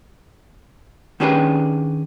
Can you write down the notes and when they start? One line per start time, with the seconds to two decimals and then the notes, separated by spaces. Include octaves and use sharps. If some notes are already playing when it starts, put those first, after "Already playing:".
1.20 D#3 C#4 D4 G4 G#4 B4